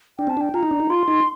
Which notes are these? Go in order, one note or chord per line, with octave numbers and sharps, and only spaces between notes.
D4 G5
C4 A5
D4 G5
F4 A#5
D#4
D4
D#4
F4 C6
D#4